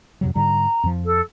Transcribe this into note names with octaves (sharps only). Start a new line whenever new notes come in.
F2 C3 F#3
G#2 D3 G3 A#5
F2 F3
A4